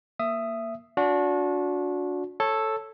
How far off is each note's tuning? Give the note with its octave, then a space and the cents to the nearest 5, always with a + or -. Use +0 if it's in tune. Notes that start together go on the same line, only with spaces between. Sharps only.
A#3 +0 E5 +15 D#6 +0
D4 -25 F#4 -30
A4 +0 C#5 -15